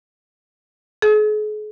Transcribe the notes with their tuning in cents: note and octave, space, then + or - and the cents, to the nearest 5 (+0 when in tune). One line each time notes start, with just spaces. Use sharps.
G#4 +40